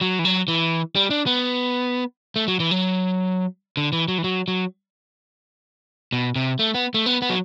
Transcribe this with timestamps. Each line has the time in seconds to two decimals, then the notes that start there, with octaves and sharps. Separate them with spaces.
0.01 F#3
0.19 E3
0.25 F#3
0.48 E3
0.96 G3
1.11 D4
1.26 B3
2.36 A3
2.48 F#3
2.60 E3
2.71 F#3
3.77 D3
3.93 E3
4.08 F#3
4.18 E3
4.24 F#3
4.48 F#3
6.12 B2
6.36 C3
6.59 A3
6.74 B3
6.94 A3
7.06 B3
7.22 B3
7.30 F#3